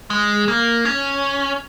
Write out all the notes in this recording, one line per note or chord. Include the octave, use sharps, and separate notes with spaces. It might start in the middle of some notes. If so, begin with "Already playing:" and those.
G#3
A#3
C#4